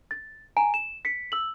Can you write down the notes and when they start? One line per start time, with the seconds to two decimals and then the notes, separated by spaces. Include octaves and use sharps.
0.11 A6
0.57 G#5 A#5 D7
0.74 E7
1.05 B6 C#7
1.32 E6 F#7